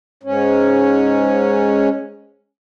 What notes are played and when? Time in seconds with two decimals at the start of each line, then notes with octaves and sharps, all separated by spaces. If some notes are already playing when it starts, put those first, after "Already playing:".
0.23 G#2 C#4